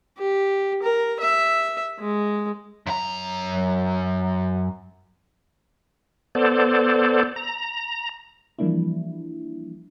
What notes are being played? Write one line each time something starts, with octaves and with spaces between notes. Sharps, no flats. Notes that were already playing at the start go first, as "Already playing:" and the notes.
G4
A#4
E5
G#3
F#2 A#5
B3 A4 C5 D5
A#5
E3 F3 G3 A#3 D4 E4